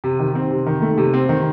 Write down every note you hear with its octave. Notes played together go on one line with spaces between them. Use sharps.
C3
D#3
C4
C3
D#3
A3
C3
C4
D#3